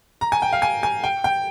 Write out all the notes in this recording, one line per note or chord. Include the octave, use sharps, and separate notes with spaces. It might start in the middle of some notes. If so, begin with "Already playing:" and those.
A#5
G#5
G5
F5
G#5
G#5
G5
G5